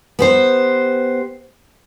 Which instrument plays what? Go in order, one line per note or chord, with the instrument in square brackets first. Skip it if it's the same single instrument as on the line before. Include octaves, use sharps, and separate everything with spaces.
[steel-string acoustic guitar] B3 G4 C5